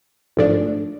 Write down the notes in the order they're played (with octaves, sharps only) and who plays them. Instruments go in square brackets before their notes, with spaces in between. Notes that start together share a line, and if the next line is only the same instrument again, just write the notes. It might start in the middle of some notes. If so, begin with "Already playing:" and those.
[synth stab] G#1 G#2 F3 A3 D4